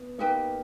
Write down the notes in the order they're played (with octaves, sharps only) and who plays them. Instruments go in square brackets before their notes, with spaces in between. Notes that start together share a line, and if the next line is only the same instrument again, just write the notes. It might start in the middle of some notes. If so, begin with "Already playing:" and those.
Already playing: [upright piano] B3
[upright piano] A#3 [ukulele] D#4 G4 B4 G5